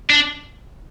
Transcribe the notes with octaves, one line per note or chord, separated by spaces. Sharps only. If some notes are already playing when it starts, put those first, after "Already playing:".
D4